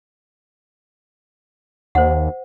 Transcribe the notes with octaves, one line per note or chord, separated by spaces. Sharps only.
D#2 C5 F#5